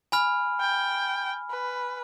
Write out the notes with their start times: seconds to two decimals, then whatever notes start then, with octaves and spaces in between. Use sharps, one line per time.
0.12 G#5 B5 F6
0.60 G5
1.51 B4